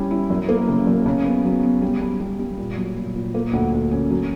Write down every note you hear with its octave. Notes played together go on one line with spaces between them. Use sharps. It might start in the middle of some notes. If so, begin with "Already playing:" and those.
Already playing: G3 C#4 E4
E4
F#2
A#3
C#3
F#2
C#3
B3
F#3
B3
G3
G3
G3
G3
A#2
F#3
A#2
A#2
A#3
D2
D2
C#4
F#3